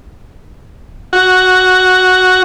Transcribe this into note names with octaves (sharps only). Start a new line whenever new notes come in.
F#4